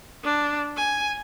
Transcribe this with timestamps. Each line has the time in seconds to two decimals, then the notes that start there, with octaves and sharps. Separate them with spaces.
0.24 D4
0.77 G#5